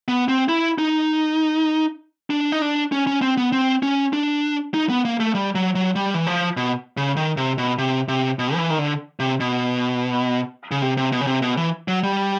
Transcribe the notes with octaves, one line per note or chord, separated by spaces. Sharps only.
B3
C4
E4
D#4
D4
D#4
D4
C#4
C#4
C4
B3
C4
C#4
D4
D#4
B3
A#3
A3
G3
F#3
F#3
G3
E3
F3
B2
C#3
D#3
C3
B2
C3
C3
B2
F3
E3
D#3
D3
C3
B2
C#3
C3
C3
B2
C#3
C3
B2
E3
F#3
G3